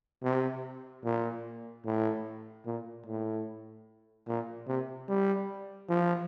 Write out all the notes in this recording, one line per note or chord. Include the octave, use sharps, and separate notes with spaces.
C3
A#2
A2
A#2
A2
A#2
C3
G3
F3